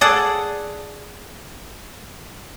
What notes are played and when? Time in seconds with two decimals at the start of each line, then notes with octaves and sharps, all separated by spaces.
0.01 G#4 A4 D5 F#5